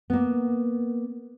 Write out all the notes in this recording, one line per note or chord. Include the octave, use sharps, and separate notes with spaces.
A#3 B3